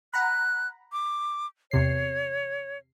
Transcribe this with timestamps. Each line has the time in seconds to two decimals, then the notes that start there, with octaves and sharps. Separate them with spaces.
0.14 F#5 A#5 B5 F#6
0.92 D6
1.71 E2 C3 C#5 C7